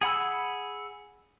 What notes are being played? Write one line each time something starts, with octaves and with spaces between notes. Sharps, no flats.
G#4 F#5 B5 E6